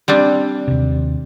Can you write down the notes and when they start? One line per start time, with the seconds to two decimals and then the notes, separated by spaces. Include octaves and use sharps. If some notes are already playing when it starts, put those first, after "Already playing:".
0.08 G3 C4 D4
0.68 D#2 C3